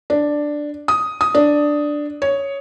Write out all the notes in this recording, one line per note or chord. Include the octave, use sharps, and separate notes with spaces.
D4
D#6
D#6
D4
C#5